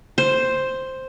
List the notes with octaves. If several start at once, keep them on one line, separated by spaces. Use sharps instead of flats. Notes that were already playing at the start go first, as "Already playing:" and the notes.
C5